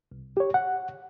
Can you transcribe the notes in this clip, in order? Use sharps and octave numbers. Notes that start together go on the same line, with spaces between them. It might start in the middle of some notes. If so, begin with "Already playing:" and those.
C2
G4 C#5
F#5